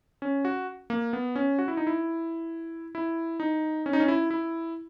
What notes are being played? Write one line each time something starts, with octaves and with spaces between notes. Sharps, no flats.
C#4
F#4
A#3
B3
C#4
F#4
E4
D#4
E4
E4
D#4
C#4
D#4
C#4
E4
E4